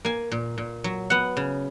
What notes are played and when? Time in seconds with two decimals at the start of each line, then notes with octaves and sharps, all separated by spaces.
0.05 A#3 G#5
0.32 A#2
0.58 A#2
0.84 F#3
1.10 B3 F#5
1.37 C#3